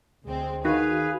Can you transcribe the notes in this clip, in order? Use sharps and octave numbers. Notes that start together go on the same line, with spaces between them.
D2 G#3 C4
D#3 F#4 G#4 B4 F5